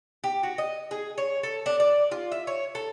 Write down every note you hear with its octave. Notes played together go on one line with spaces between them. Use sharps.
G4
F#4
D#5
G#4
C#5
A4
D4
D5
F4
E5
C#5
A4